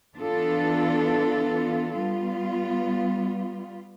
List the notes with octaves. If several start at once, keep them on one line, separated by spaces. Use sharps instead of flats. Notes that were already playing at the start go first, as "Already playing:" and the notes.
E3 B3 D4 F4 A4
G3 B3 F4